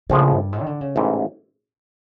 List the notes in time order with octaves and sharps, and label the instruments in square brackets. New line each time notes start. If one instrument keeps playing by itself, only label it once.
[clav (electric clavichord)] A#1 A2 F3 G#3 [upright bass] C#3
[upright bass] G2
G#2
D#3
D3
C#3
[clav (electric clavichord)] A1 G#2 E3 [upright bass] C3